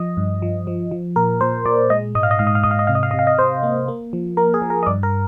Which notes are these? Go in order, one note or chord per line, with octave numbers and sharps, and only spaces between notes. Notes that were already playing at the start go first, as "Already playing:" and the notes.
Already playing: F3 D#5
G2
F3
F3
F3
A#2 A#4
A#2 C5
A#2 D5
G#3 D#5
G#2 D#5
F5
D#5
G#2 F5
D#5
F5
G#2 D#5
F5
D#5
C3 F5
D#5
F5
C3 D#5
F5
D#5
C3 C5
A#3
A#3
F3
A#3 A#4
G#4
F3
A#4
D#5
G2 D5
A#4